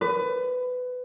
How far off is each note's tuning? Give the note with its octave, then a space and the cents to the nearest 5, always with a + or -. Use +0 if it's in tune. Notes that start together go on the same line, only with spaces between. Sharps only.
B4 +20